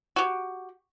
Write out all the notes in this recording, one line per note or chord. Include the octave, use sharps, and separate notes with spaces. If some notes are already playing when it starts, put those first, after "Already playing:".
F#4 G4